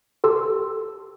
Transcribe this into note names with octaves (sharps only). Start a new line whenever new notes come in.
G4 A4 C6 E6